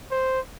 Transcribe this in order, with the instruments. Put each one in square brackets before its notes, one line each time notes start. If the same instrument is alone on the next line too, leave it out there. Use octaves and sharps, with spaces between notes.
[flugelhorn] C5